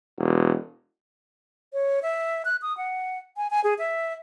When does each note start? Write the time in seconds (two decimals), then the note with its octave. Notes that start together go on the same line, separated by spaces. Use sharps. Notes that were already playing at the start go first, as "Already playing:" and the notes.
0.18 E1
1.73 C#5
2.03 E5
2.45 F#6
2.62 D#6
2.77 F#5
3.37 G#5
3.50 G#5
3.64 G#4
3.79 E5